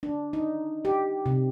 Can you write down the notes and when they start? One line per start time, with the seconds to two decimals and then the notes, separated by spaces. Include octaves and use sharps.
0.03 D4
0.33 D#4
0.85 G4
1.26 C3